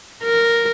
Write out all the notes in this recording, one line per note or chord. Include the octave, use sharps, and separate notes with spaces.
A#4